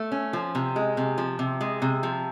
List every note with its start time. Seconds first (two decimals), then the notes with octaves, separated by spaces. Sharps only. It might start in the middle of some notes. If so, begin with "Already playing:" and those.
Already playing: A3
0.12 C#4
0.33 F3
0.55 C3
0.76 G#3
0.97 C3
1.18 F3
1.39 C3
1.61 G#3
1.82 C3
2.03 F3